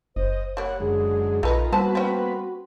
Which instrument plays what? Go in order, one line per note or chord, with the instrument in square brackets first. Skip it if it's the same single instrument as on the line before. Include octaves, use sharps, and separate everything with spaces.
[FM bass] F#1 [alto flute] C5 [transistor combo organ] D#5
[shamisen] G3 A#3 [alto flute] C#5 [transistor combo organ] F#5
[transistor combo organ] F#2 D3 G#3 [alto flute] G#4
[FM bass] A#1 [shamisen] A3 B4 D#5 [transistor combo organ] D#4 F4 A#4 [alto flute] G#5
[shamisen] E3 C5 A5 [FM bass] G3 [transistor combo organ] A#3 B3 B4 [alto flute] F#4
[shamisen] C4 C#4 [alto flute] F#4